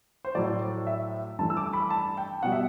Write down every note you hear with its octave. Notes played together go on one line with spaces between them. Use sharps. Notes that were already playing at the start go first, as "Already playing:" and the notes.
C5
A2 F#3 A3 D5
E5
G2 E3 A3 A5
E6
D6
B5
A5
G5
B2 G3 F#5
E5